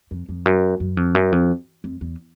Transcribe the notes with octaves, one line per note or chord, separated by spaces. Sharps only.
F2
F2
F#2
F#2
F2
F#2
F2
F2
E2